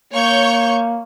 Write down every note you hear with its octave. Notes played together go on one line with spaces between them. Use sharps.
A#3 C#5 C#6 G6